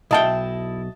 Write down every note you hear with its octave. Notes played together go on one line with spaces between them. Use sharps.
B1 E4 D#5 F5 G5 A5